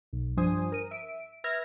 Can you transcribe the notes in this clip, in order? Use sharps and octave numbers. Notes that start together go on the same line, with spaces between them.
B1
G2 F3 D4 C5 G#5 D#6
A#4 D#7
E5 D7
B4 E5 F6 G#6 A#6